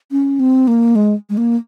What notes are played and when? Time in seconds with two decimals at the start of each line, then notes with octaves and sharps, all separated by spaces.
0.11 C#4
0.39 C4
0.67 A#3
0.95 G#3
1.30 G#3
1.37 A#3